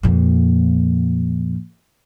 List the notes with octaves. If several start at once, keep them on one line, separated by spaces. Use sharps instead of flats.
F2 A#2